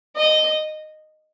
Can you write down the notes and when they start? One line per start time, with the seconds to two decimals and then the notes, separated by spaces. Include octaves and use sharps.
0.16 D#5